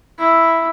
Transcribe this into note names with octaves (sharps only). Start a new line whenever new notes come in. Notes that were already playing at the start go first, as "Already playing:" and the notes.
E4